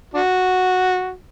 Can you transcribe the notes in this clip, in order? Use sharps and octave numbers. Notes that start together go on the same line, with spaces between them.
D4 F#4